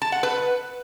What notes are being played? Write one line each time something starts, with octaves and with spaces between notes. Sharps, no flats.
A5
F#5
B4